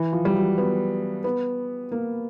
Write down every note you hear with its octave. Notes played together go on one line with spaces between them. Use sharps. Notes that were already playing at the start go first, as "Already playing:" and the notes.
Already playing: E3
F3
G3
F#3
B3
B3
A#3